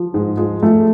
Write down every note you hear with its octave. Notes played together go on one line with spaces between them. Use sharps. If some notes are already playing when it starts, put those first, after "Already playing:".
Already playing: F3
G#2 G#3
F3 G#3
F3 A3